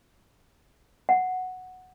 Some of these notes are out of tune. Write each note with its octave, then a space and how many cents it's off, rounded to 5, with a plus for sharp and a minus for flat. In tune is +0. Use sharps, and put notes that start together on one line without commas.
F#5 +0